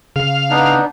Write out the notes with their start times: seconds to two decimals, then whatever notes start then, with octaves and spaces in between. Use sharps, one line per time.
0.16 C#3 F5
0.50 B3 D4 D#4